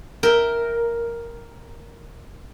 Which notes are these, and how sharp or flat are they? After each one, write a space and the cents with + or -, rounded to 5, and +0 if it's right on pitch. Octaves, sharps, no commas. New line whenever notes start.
A#4 +0 E5 +0 G5 +0